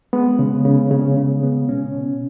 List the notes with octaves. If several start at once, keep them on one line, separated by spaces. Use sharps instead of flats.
G#3 B3
C#3
C#3
C#3
C#3
B3
B2 C#4
B2